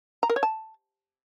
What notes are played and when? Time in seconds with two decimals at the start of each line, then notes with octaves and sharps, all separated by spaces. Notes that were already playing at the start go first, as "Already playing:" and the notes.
0.23 A#5
0.30 A#4
0.36 C#5
0.43 A5